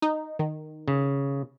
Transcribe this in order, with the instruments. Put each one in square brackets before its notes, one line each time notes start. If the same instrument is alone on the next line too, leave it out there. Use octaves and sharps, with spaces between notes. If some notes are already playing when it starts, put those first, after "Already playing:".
[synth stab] D#4
D#3
[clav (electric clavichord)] C#3